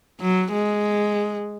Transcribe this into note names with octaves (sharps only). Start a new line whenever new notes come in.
F#3
G#3